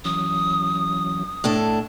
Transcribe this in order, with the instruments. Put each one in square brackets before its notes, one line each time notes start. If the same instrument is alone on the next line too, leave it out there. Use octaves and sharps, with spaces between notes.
[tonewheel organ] E3 F#3 C#4 [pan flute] D#6
[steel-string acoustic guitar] A2 D4 A4